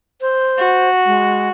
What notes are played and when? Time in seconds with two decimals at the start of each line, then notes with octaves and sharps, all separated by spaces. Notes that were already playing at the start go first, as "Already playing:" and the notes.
0.21 C5
0.58 F#4
1.06 G#3